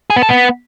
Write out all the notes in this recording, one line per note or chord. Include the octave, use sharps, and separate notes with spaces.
G#4
B3
A4
B3